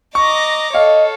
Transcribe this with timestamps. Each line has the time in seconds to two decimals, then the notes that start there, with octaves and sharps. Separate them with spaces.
0.15 D#5 A#5 C#6 D6
0.75 A4 C#5 D#5 F5